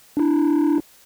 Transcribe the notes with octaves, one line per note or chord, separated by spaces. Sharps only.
D4 E4